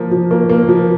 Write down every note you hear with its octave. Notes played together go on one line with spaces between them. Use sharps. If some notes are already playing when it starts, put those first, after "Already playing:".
Already playing: F3 A#3
F3
A#3
A#3
F3